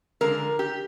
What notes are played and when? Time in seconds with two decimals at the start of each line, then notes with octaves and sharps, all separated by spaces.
0.21 D3 F3 G#3 A#4
0.59 G4